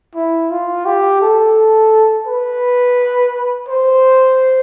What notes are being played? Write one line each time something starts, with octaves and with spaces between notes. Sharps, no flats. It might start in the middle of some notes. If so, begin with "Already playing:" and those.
E4
F4
G4
A4
B4
C5